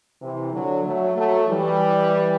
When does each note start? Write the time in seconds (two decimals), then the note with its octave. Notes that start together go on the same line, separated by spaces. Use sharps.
0.22 C3 E3
0.53 D3 F#3
0.85 F#3 A3
1.17 F#3 A3
1.49 E3 G3